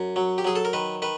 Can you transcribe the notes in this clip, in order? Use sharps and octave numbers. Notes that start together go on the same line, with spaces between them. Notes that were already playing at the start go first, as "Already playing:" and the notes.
Already playing: F#2
F#3
G4
F#3 G#4
A4
A#4
D#3 B4
D#3 B4